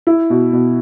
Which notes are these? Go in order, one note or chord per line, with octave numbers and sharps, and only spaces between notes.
E4
B2
B2